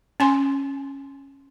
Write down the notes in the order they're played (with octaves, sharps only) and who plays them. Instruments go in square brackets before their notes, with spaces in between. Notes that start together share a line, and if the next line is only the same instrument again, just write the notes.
[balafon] C#4 G#5 C6